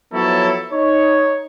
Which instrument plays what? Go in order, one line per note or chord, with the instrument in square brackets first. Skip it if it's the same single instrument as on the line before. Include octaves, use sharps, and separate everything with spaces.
[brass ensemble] F3 F#3 B3 E4 A4 C#5
D#4 C#5